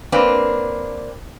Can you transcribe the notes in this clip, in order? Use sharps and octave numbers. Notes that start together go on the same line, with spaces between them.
A#3 C4 D4 B4